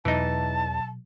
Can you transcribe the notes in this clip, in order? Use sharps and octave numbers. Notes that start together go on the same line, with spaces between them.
E2 B2 E3 F#3 D#4 A5